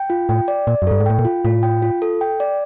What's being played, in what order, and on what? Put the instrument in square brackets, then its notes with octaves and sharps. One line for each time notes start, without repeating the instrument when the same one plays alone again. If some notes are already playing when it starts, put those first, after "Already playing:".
Already playing: [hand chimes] G5
F4
[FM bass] A2 [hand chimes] G5
[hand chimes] D5
[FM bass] A#2 [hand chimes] D5
[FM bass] F#2
[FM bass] G2 [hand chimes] A4
[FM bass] G#2
[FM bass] A2 [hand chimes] G5
[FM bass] A#2
[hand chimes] F4
[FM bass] A2 [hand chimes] F4
[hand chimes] G5
F4
A4
G5
D5